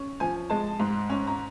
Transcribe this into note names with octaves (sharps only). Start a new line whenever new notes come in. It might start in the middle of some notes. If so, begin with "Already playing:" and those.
Already playing: C#4
F3 G#5
G#3 A5
G#2
C#4
A#5